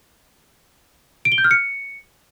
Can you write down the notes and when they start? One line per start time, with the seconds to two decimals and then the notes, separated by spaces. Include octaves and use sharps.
1.25 D7
1.32 G7
1.38 G6
1.44 F6
1.51 C#7